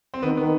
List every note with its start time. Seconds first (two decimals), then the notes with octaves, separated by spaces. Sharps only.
0.14 C4
0.22 D#3 B3
0.37 D#3 B3